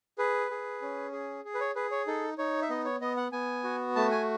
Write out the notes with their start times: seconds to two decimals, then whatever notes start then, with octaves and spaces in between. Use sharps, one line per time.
0.18 G#4 B4
0.51 G#4
0.82 C#4
1.12 G#4
1.45 G#4
1.54 B4
1.60 C#5
1.75 G#4 B4
1.91 C#5
2.07 D#4 A4
2.38 D#4 C#5
2.62 E5
2.69 B3 D#5
2.85 C#5
3.01 B3 D#5
3.17 F#5
3.32 B3 G#5
3.64 F#4
3.96 A3 A5
4.11 G#5